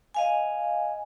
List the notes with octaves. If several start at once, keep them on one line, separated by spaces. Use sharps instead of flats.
D#5 F5 G#5